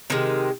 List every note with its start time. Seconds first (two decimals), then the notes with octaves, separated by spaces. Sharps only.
0.10 C3 D#3 G#3